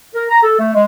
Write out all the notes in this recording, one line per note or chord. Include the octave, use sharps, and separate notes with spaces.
A#4
A#5
A4
A3
G#3